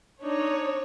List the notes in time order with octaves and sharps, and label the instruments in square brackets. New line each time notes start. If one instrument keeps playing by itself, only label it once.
[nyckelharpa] D4 D#4 [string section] C#5